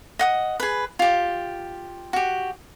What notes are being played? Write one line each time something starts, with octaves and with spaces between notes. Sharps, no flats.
D#5 F#5 D#6
G#4 B4
F4 G4
F#4 G4